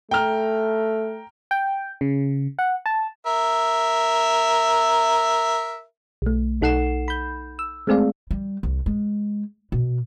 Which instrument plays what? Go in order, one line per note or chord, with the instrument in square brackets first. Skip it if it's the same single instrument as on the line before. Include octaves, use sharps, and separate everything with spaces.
[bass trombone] A3 [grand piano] G5 A#5 F6
[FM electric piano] G5
C#3
F#5
A5
[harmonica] A#4 E5
[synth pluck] B1 A3
B1 D#4 A4 F#5 C7 E7
B5 G6
E6
G#3 A3 C4 G#4 D5 F5
[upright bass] G3
C2
G#3
B2